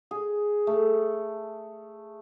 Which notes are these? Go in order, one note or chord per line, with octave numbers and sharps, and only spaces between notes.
G#4
A3